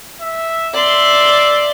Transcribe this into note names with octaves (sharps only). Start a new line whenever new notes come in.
E5
D5 E5 C6